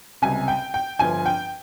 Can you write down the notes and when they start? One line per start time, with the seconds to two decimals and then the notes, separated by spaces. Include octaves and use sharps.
0.22 C#2 C3 G3 G#5
0.48 G5
0.74 G5
0.99 G1 G2 F3 G#5
1.26 G5